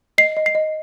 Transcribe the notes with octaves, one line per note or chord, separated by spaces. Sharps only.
D#5 C7
D#5
C7
D#5